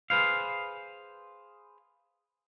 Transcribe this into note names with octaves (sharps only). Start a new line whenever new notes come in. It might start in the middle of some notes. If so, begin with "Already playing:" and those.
G#4 B4 C5 F5